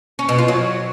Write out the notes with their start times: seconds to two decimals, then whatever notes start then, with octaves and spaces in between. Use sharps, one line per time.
0.19 C#4
0.29 B2
0.38 F4
0.48 F#3